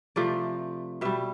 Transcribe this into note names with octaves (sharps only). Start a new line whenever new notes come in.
C3 F3 A3 D5
B2 G3 E5